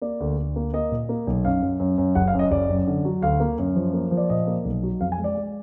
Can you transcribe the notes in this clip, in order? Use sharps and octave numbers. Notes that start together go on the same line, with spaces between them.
A#3 D5
D2
D2
A#3
A#3 D#5
A#2
A#3
B1
F#2 F5
F#2
F#2
F#2
F#1 F#5
F5
F#2
D#5
F#1 D5
F#2
D3
F#3
D2 F5
A#3
F#2
F3
A#3
F3
D5
A#2 D#5
A#3
B1
F#3
F2 F5
G#5
G#3
D5
G#3